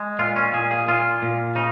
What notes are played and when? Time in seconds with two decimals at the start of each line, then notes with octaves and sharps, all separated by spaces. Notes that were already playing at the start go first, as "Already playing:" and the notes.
Already playing: G#3
0.19 A#2 F4
0.36 C#4
0.53 A#2 G#4
0.71 G#4
0.88 A#2 F4
1.22 A#2
1.55 C#3 D#4